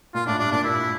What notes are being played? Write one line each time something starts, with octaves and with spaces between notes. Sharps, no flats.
A#2 F4
A2 D4
G2 D4
A#2 D4
A#2 E4